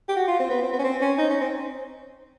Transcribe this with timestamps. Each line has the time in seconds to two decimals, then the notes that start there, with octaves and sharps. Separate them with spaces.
0.09 G4
0.16 F#4
0.28 F4
0.40 C4
0.50 B3
0.62 C4
0.73 B3
0.79 C#4
0.84 C4
1.01 C#4
1.18 D#4
1.30 C#4
1.41 C4